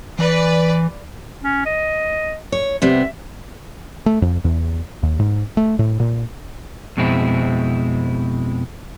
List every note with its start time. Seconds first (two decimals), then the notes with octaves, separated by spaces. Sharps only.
0.19 E3 B4 D5
1.44 C#4
1.66 D#5
2.52 C#5
2.82 C3 G3 B3 E5
4.06 A3
4.22 F2
4.44 E2
5.03 D#2
5.19 G#2
5.57 A3
5.79 A2
6.00 A#2
6.97 F2 B2 G#3 C4 E4